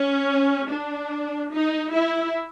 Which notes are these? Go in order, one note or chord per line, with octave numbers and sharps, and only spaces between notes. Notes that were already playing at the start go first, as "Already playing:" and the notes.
Already playing: C#4
D4
D#4
E4